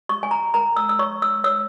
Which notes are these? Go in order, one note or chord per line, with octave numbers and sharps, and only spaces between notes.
G4 C#6
G#5
A#5
A#4 A#5
E6
E6
C#5 C#6
E6
C#5 E6